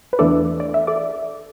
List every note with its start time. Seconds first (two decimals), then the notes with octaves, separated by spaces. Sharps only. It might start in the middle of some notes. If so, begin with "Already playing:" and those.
0.13 B4
0.19 E2 E3 A3 D4 A4 D5
0.60 D5
0.74 E5
0.87 A4 D5